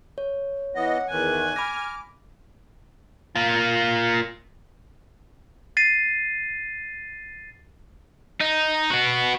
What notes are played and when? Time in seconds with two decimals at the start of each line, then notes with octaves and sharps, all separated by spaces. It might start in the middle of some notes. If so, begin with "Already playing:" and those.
0.18 C#5
0.75 E3 B3 D#5 F#5
1.10 E2 D#3 E3 G#5 F#6
1.56 B5 D6 F6 A#6
3.36 A#3 F4
5.77 A6 C7 D#7
8.40 D#4
8.90 B3 F#4